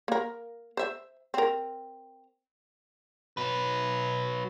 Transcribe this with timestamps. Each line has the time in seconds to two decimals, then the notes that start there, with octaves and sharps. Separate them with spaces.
0.08 A#3 A#4
0.77 C5 E5
1.34 C4 A#4
3.37 F#3 B4